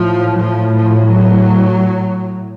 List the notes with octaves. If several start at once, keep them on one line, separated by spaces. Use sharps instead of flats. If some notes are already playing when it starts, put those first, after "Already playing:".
Already playing: A2 F3
F3
F3
F#3